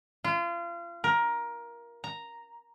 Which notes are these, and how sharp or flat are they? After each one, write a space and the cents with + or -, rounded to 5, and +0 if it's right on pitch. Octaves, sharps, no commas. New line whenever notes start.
F4 -30
A#4 +15
A#5 +0